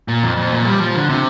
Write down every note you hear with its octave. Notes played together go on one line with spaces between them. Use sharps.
A#2
F2
F2
A#2
G3
F3
D3
C3